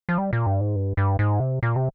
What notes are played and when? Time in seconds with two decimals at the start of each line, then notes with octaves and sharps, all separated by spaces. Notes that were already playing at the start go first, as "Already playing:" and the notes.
0.09 F3
0.18 G3
0.33 A#2
0.46 G2
0.61 G#2
0.76 G2
0.97 G2
1.19 G#2
1.40 C3
1.63 A#2
1.76 C3